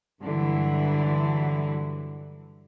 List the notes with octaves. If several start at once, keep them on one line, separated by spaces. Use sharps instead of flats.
G2 D3 E3 F#3 E4